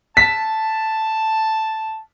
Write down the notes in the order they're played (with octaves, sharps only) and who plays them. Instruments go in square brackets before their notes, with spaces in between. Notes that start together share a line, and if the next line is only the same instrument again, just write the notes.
[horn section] A5 [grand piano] B6